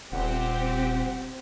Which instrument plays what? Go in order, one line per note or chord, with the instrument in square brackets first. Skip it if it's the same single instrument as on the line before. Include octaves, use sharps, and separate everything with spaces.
[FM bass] D#1 [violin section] C4 G4 [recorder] F#5